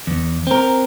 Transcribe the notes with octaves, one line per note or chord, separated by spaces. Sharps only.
E2
C4 A#4